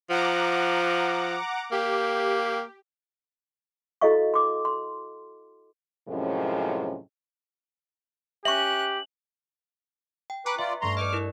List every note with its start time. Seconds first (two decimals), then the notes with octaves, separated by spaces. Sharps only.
0.10 F3 F#5 A#5 D6
1.72 A#3 G4
4.01 E4 F#4 A4 D#5 F5 C#6
4.34 C6 D6
4.65 C6
6.08 F#2 A2 C3 F3 G#3 C#4
8.45 C#4 G4 E5 C#6 F#6 F#7
10.30 G5
10.46 B4 G#5 A#5 C#6 D6 F#6
10.59 F4 B4 D5 E5
10.82 G2 A3 A#5 C6 C#6
10.97 B4 D5 D#5 D6 F6
11.13 E4 A#4